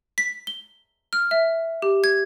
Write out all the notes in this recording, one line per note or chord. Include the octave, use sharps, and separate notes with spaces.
B6
G7
F6
E5
G4
G#6